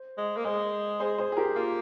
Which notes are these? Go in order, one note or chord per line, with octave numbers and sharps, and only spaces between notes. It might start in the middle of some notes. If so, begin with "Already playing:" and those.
Already playing: C5
G#3
A#3
G#3 G#4 C5
G#4 C5
G#4 C5
G#4
G4 A#4
A#3 F4